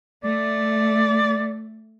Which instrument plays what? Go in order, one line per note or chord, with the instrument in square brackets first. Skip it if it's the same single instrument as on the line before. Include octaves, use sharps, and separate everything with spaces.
[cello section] A3 [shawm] D5